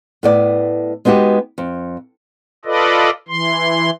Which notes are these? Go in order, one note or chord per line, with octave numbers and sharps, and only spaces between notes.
A2 B3 D5
G#3 B3 D#4 F#4 G4
F2
F4 A4 B4 D5 D#5
E3 C6